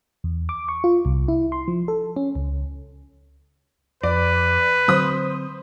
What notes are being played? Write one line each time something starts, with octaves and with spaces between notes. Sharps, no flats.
E2
D6
C#6
F4
C2
E4
C6
F3
A4
C#4
C#2
F2 B4 D5
D3 F#3 C4 C5 D#6